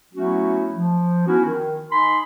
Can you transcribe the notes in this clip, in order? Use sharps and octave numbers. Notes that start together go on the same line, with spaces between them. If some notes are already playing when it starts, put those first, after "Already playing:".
F#3 A3 B3 C#4 E4 F#4
F3
B3 C#4 D#4 E4 F#4
D#3
D#4 G#5 B5 C6